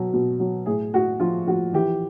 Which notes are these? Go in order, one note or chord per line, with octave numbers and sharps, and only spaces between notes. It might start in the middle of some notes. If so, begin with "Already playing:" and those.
Already playing: B2 F#3
B2
F#3
A2 G#4
A2 F#4
F3 F4
F3 F#4
E3 G4